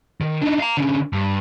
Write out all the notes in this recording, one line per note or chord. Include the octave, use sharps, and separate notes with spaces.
D#3
D4 D#4
F5 A#5
D3 C#4
G2